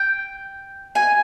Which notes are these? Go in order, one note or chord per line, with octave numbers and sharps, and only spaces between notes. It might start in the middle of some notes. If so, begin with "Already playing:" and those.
Already playing: G5
G#5